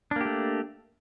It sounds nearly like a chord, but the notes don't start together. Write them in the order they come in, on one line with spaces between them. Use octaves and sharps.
D4 A#3 G4 A3